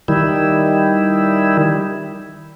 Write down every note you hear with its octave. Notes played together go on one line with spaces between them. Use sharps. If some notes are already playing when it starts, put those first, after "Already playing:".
D#3 G3 E4